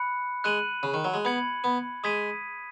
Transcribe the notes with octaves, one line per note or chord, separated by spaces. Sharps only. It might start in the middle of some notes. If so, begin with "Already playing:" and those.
Already playing: B5 F#6 C#7
G#3 F#6 D#7 F#7
C#3
D#3
F#3
G#3
B3 B5 G#6 C#7 F#7
B3
G#3 D#6 G#6 B6 D#7